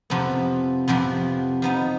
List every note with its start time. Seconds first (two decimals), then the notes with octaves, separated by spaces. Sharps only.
0.10 F2 C3 F3 B3
0.88 F2 C3 F3 B3
1.62 F3 B3 D#4